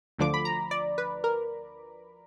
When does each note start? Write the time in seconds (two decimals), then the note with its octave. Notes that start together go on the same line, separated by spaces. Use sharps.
0.19 D2 D3 F3 D6
0.34 B5
0.45 A#5
0.71 D5
0.98 B4
1.24 A#4